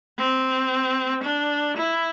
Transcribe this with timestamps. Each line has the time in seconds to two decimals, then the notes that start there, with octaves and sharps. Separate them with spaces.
0.18 C4
1.23 D4
1.77 E4